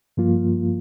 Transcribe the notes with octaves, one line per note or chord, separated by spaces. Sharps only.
G2 F3 A#3 F4